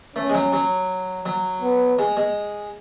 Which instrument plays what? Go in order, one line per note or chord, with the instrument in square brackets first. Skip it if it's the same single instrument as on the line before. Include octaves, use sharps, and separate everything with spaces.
[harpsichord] A3 [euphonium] C#4
[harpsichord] G#3
F#3
F#3
F#3
[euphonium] B3
[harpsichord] G#3
G#3